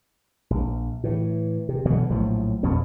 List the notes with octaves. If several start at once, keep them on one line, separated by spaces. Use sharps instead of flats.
A#1
A2 E3
C3
B2 D3 E3 F#3
A#1 A2 F3 F#3
F2 B2 F3 C#4